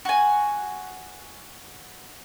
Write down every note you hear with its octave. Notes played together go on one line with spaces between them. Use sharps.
F#4 G#5